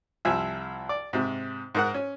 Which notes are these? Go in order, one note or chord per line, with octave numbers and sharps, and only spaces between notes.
C2 F3 E5 G#5
D5
G#2 C3
G#2 A#4 F#5
C#4